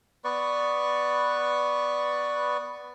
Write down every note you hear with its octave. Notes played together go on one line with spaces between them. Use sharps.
B3 B4 D5 C#6